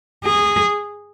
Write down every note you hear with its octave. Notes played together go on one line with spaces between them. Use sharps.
G#4